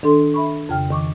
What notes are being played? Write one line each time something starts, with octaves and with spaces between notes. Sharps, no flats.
D#3 D4 A4 C6
E5 B5 C#6
F2 C#3 G5 F6
D#3 C#6 D6